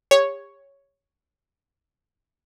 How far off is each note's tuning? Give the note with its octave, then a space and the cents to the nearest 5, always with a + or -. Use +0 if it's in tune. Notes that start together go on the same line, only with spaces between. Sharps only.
G4 +35 C#5 +0